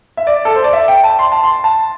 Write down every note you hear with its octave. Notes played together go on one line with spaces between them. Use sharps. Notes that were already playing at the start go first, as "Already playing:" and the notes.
E5
D5
A4
C5
D5
E5
G5
A5
C6
A5
C6
A5